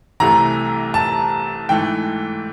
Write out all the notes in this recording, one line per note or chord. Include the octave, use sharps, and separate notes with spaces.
C2 C3 E3 A3 A#5
A5
G#2 E3 A3 G5